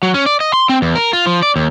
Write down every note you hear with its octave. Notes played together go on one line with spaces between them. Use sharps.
F#3
C#4
D5
D#5
C6
C4
E2
A#4
F4
F3
D5
D#2